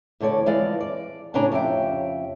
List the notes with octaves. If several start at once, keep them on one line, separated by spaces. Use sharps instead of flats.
E2 D3 A3 C#5 D5
F2 E3 G#3 D5 F5
D5
A2 C#3 C#4 D4 A#5
F2 C#3 G4 E5 G5